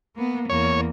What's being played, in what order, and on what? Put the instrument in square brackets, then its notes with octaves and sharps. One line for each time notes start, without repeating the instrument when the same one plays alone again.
[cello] A#3 B3
[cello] E2 A#3 [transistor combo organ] C#5